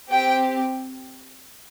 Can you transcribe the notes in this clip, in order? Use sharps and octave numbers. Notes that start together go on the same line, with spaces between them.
C4 G4 G5